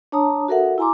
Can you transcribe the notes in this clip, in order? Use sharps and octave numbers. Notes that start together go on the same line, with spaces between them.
D4 C#5 A5 A#5 D#6
F#4 A4 A#4 E5 F#5
E4 G#5 A#5 C6 D6